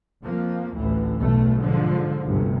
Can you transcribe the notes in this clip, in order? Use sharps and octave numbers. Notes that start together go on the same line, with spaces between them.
F2 F3 A#3
A1 D2 E3
B1 E2 B2 A3
G#2 D3 F3
G1 D2 C3